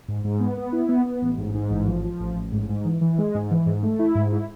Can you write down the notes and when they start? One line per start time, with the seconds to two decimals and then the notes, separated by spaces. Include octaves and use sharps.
0.08 G#2
0.24 G#2
0.40 B3
0.57 B3
0.72 E4
0.89 B3
1.06 B3
1.22 A1
1.38 G#2
1.54 G#2
1.70 A1
1.87 F3
2.04 F3
2.20 A1
2.36 A1
2.52 G#2
2.69 G#2
2.85 E3
3.01 E3
3.18 G#3
3.35 G#2
3.51 E3
3.66 G#2
3.83 A3
3.99 E4
4.15 G#2
4.33 E4